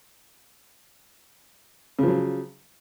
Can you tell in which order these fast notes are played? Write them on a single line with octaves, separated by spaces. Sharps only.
C#3 F3 F#3